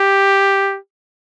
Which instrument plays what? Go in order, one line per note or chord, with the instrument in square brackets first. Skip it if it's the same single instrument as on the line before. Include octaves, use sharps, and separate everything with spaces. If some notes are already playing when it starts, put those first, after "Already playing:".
Already playing: [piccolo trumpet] G4